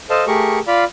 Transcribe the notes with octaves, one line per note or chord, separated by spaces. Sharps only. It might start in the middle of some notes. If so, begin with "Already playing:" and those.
A4 C5 D#5 F5 A5
A3 G4 G#4 A#4 C#6
F4 D5 F5 B5